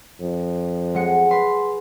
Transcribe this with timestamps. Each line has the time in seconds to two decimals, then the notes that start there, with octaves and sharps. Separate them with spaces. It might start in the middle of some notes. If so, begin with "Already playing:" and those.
0.21 F2
0.95 G#3 F#5 C#7
1.31 B4 C6